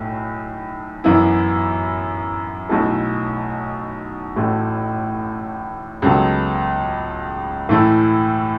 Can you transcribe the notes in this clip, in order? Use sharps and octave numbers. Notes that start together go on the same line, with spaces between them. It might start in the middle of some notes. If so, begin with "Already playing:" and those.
Already playing: B1 A2 A3
F#2 E3 B3 E4
B1 B2 A3 E4 A4
A1 A2 A3 F#4 A4
C#2 C#3 F#3 B3 A4
A2 E3 A3 E4